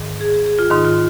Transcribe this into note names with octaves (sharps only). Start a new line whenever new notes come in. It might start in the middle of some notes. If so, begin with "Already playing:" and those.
Already playing: G#2 D#3
G#4
G#4
G#4
F4
G#2 D#3 D#4
F4